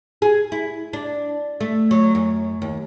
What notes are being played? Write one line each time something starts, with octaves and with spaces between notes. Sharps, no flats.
G#4
E4
D4
A3
F#3
F#2
D#2